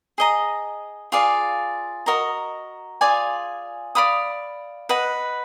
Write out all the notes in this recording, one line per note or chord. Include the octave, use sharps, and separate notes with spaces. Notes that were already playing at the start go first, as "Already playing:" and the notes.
G#4 D#5 A#5
F4 G#4 D5 F5
F#4 A#4 D#5 A#5
F4 G#4 D5 G#5
D5 F5 B5 D#6
B4 D#5 F#5